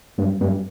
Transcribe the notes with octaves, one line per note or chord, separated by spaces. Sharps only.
G2
G2